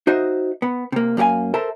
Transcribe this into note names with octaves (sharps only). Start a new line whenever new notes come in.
D#4 F#4 C5 D#5 E5
B3
C3 A#3
F#2 A#3 G4 F5 G#5
A4 A#4 C5 E5 A5